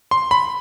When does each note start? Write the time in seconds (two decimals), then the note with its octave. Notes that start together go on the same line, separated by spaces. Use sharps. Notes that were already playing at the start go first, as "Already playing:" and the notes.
0.11 C6
0.31 B5